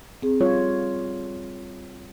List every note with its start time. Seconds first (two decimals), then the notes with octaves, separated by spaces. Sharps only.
0.22 C4 G#4
0.40 G3 F4 C#5